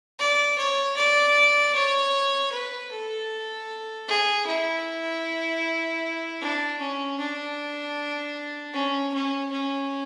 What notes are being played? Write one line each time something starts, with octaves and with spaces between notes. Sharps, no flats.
D5
C#5
D5
C#5
B4
A4
G#4
E4
D4
C#4
D4
C#4
C#4
C#4